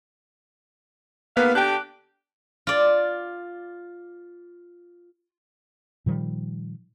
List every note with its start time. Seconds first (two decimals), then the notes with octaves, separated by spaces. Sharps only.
1.37 G#2 A#3 B3 B4 F5
1.55 D3 D4 G4 G5 A5 F#6
2.67 F4 D5
6.06 A#2 D#3 F3 G3